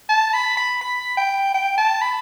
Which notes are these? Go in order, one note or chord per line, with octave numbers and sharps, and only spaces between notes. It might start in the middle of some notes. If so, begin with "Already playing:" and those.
A5
B5
B5
B5
G5
G5
A5
B5